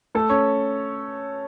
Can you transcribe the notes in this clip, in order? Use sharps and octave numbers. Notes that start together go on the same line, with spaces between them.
A3 A4
C#4 C#5